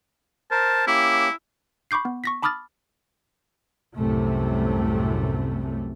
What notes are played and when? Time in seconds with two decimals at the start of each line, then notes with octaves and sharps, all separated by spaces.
0.51 A#4 C5 A5
0.87 A#3 C#4 E4 G4
1.91 B5 C#6 D6 G6 C7
2.05 B3
2.24 C#6 A#6 B6
2.42 A5 B5 D6 D#6 F6 A6
3.96 C2 F#2 A2 C3 A3